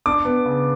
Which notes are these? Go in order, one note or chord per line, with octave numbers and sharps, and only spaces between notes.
D4 D6
B3
C#3